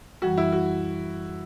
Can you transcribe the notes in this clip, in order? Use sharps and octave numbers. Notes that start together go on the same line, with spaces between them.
F#2 E3 G3 F#4
E4
F#4